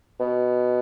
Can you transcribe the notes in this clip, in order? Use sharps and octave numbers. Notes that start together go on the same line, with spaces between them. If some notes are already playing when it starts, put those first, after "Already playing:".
B2